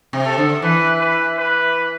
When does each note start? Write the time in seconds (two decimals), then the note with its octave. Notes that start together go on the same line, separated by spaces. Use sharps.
0.13 C3
0.25 A4
0.38 D3
0.62 E3 B4
1.00 B4
1.38 B4